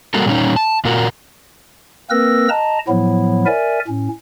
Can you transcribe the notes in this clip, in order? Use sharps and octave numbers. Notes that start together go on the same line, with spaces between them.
G3 A#3 F#4 A4 A#4
A#2 G3 C#4 D#4
A5
A#2 F4 F#4 A#4
A#3 C4 A#4 B4 E6 A#6
D#5 A5 A#5
A2 F3 F#3 B3 E4
A#4 D5 E5 G#5
A2 C#4